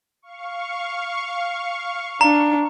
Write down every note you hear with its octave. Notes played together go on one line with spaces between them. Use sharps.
F5 C#6
D4 A#5